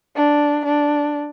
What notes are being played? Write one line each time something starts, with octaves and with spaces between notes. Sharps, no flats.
D4
D4